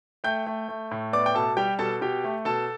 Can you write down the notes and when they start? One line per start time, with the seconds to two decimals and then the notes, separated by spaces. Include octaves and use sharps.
0.24 A3 G5 G6
0.46 A3
0.68 A3
0.91 A2
1.13 B3 D5 D6
1.26 G5
1.35 B2 A4 A5
1.57 G3 G4 G5
1.79 B2 A4 A5
2.01 B2 G4 G5
2.24 A3
2.45 B2 A4 A5